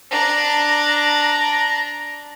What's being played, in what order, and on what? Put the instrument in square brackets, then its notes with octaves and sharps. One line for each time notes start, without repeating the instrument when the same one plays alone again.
[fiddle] D4 A#5